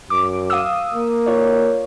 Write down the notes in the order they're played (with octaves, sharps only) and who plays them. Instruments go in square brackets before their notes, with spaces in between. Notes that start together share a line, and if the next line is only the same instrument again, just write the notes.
[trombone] F#2 [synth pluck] D6
[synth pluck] F5 D#6 E6
[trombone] A#3
[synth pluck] F4 C#5 D5